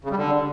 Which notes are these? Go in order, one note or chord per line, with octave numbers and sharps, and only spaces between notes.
C#3
G3
D3